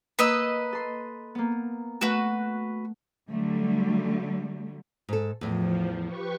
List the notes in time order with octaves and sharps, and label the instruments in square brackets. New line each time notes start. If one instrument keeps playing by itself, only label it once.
[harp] A#3 [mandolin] B4 D#5 E6
[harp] A4 C6
A#3 B3
[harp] A3 F#5 [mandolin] F#4 B4
[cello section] D3 F#3 G3 A3
[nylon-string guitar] G#2 A4
[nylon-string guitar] E2 A2 [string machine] F3
[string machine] G4 B4 C#6